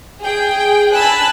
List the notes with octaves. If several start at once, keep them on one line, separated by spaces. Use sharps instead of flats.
G#4 G5
G#5 A5 B5 E6 F#6